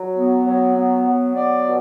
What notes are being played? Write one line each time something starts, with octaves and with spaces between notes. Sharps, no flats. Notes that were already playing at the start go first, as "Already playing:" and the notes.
Already playing: F#3
B3
F#3
B3
F#3
B3 D5
B2